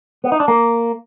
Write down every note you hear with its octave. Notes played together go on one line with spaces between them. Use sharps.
B3
D#4
D4
A#3